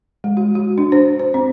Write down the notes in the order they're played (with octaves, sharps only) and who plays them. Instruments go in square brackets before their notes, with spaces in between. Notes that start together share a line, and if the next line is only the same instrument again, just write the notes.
[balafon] G#3
F#4
F#4
D4
C5
C5
C4